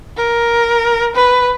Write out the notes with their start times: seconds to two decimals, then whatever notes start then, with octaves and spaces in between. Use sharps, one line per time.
0.17 A#4
1.15 B4